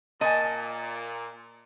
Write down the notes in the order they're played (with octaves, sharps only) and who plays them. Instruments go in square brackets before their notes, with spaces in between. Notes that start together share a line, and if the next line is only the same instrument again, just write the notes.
[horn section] A#2 [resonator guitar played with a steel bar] D#5 [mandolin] G#5 A5